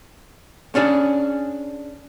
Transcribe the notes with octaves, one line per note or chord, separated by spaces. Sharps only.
C#4 D4 G#4